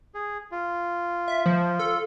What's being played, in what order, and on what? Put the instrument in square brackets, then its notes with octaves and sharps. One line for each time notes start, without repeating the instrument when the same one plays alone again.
[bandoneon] G#4
F4
[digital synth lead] E5
F3
A4